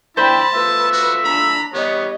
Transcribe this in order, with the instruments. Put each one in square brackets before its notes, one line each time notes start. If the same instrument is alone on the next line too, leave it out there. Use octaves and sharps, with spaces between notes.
[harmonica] D4 E4 [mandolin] C5 [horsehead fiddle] G5 B5 [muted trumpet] A5
[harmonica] A3 F4 E5 [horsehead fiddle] B4
[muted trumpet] F#4
[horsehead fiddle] D4 A#5 [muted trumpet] B5
[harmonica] G3 C#5 [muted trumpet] B3 [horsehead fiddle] D#5